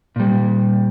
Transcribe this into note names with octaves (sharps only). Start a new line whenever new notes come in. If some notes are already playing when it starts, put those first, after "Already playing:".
A#2 G3